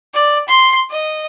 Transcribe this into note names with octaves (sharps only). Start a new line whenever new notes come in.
D5
C6
D#5